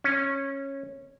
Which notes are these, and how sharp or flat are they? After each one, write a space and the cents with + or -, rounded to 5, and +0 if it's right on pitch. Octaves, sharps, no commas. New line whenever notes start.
C#4 -15